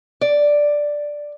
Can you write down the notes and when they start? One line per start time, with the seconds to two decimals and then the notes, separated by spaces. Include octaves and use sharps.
0.21 D5